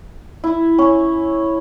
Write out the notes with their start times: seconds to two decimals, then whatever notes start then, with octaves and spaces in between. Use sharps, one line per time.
0.44 E4
0.78 C#4